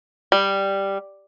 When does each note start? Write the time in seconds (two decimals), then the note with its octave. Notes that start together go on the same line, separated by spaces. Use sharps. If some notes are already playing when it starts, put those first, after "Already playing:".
0.32 G3